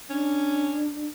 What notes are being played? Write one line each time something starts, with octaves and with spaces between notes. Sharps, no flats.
C#4 D4